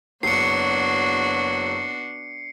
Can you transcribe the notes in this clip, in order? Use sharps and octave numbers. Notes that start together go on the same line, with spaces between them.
F#1 B3 D4 F#4 C#5 C7 C#7